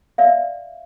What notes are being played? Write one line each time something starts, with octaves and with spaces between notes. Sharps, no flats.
D5 E5 F5